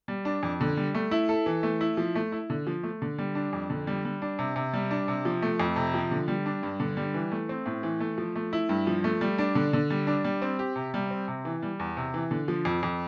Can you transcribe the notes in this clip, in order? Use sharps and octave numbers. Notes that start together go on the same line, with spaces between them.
G3
D4
F2
D3
G3
A3
E4
A4
E3
A3
E4
F3
A3
E4
D3
F3
A3
D3
G3
D4
F2
D3
G3
G3
D4
C3
C3
G3
D4
C3
F3
A3
F2
C3
F3
D3
G3
D4
G2
D3
G3
E3
A3
C4
A2
E3
A3
F3
A3
E4
G2
F3
A3
G3
D4
D3
D3
G3
D4
G3
C4
G4
C3
G3
C4
C3
E3
G3
E2
C3
E3
D3
F3
F2
F2